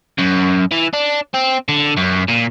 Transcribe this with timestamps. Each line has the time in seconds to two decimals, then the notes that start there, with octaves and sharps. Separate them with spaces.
0.18 F#2
0.71 E3
0.93 D4
1.34 C4
1.68 D3
1.98 F#2
2.29 A#2